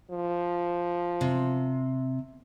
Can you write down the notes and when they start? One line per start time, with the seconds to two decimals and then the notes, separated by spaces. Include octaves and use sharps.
0.11 F3
1.21 C3